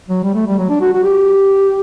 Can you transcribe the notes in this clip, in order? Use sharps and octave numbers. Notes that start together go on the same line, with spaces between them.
F#3
G3
A3
G3
F#3
D4
F#4
F#4
G4